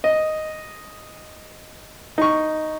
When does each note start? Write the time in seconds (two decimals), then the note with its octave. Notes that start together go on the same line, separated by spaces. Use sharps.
0.04 D#5
2.18 D#4 C#6